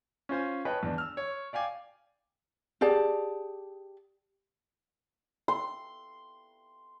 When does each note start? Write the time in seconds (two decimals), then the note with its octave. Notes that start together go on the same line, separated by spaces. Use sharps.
0.29 C#4 F4 C5 G#5
0.65 B4 C#5 D#5 G5 A5
0.83 E2 D4
0.98 E6 F6
1.17 C#5
1.53 D5 F5 G5 G#5 D6
2.81 G4 G#4 D5 A5
5.48 C6